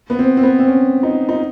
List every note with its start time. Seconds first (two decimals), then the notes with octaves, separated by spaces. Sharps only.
0.10 B3
0.19 C4
0.37 C4
0.43 B3
0.59 C4
0.68 C#4
1.03 D#4
1.29 D#4